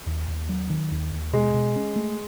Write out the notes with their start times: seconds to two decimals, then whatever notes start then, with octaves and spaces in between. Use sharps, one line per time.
0.07 D#2
0.28 D#2
0.49 F#3
0.70 D#3
0.91 D#2
1.12 D#2
1.33 B2 G#3
1.54 B2
1.76 C#4
1.96 A3